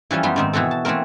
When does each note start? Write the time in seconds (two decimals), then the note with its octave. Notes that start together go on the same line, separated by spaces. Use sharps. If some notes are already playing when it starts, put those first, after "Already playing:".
0.11 E3 F3 G3 C#4
0.23 F#2 G3 B3 C6
0.36 G#2 D#3 C4
0.53 B2 E3 F#4 A4
0.71 A5
0.85 E3 A3 A#3 C4 A#4